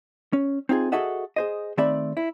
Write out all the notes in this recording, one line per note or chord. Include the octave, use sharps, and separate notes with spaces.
C#4
C4 D#4 F4 G#4
F#4 G#4 A4 D#5 E5 F#5
G#4 C5 D#5
D#3 A3 C4 D5 E5 B5
E4